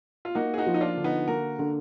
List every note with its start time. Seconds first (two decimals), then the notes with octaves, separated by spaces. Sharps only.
0.25 F4
0.35 A#3 D#4 F#4
0.54 G#4
0.58 D#4 F#4
0.66 F3
0.74 D#4
0.81 D4 F4
0.97 D3
1.04 B3 D#4
1.27 A#3 F#4 A#4
1.59 D3